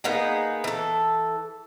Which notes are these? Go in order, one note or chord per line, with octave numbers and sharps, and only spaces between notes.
A#3 B3 D#4 G#4
E3 A4